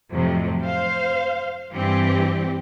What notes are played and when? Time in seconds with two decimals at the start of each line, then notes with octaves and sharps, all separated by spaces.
0.11 F2 A2 C3 F#3 A3
0.59 C5 F5
1.73 G2 E3 C4 G4